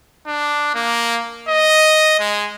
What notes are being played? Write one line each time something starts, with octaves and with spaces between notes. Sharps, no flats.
D4
A#3
D#5
G#3